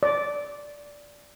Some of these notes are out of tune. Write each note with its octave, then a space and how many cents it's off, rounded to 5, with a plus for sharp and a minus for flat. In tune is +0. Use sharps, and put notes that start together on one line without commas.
D5 -10